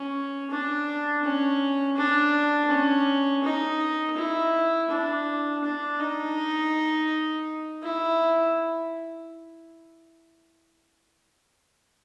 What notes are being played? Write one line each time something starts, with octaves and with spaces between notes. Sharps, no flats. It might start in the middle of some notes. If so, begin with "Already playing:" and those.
Already playing: C#4
D4
C#4
D4
C#4
D#4
E4
D4
D4
D#4
E4